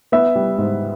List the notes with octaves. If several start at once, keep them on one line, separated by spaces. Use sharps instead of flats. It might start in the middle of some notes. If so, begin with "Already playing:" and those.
B3 E5
G3
G#2